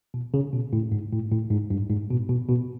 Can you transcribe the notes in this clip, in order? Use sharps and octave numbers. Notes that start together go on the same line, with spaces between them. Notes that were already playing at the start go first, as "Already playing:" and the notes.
B2
C#3
B2
A2
G#2
A2
A2
G#2
G2
G#2
B2
B2
B2